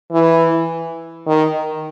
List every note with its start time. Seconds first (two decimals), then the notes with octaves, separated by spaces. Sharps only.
0.12 E3
1.27 D#3